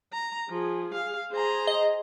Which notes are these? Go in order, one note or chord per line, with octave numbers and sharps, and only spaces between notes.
A#5
F3 G#4
F5
G#4 C5 A#5
D#5